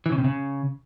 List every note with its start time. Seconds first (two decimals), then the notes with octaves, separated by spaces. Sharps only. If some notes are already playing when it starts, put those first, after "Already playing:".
0.06 E3
0.12 C#3
0.18 C3
0.24 C#3